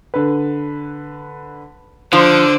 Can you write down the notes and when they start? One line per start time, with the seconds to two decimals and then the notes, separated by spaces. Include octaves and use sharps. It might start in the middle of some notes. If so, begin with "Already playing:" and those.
0.14 D3 B4
2.13 D3 F3 C5 D5